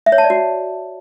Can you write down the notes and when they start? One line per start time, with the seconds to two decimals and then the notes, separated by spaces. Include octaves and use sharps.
0.06 E5
0.12 C#5
0.18 A5
0.24 D5
0.30 F#4